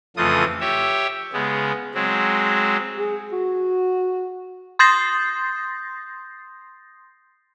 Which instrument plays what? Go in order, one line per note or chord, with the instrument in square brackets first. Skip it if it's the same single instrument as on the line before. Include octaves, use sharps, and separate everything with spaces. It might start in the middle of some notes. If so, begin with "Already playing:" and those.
[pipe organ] F2 C#3 E3 A3 F4 D#6
G4 C#5 E5
C#3 G#3 B3
F#3 G#3 C4
[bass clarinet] G#4
F#4
[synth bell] C6 D#6 G6 A6 A#6 C7